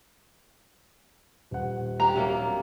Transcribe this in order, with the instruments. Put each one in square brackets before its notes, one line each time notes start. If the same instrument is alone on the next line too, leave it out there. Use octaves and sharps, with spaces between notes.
[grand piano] D#1 F#5
[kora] D4 G4 [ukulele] A#5
[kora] C3 F#3 A#3